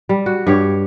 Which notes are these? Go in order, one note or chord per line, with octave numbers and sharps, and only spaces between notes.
G3
F#4
G2 G4 C#5